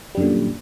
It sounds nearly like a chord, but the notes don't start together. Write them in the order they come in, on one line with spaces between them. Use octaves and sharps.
G3 F#2 D3 A#2